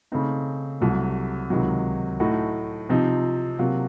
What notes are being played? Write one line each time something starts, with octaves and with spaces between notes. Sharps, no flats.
C#3 A3 C4 D#4
C2 C3 F#3 A3
C#2 C3 D#3 F#3
A2 A3 D#4 F#4
C3 F3 C4 D#4
C3 F#3 A#3 F4